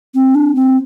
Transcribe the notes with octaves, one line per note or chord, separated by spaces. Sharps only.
C4
D4
C4